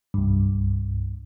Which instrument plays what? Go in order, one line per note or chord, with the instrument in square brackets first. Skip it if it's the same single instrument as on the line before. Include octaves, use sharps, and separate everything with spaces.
[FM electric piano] C2 G2